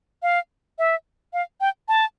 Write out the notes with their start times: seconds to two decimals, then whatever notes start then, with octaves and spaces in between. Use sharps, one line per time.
0.23 F5
0.79 E5
1.33 F5
1.61 G5
1.88 A5